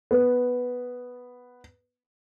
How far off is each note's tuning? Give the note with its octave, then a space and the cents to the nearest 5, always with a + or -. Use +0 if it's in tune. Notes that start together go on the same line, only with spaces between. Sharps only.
B3 +0